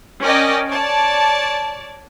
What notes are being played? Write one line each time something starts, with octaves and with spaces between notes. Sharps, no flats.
C#4 A#4 D5 D#5 G5
C#5 D5 A5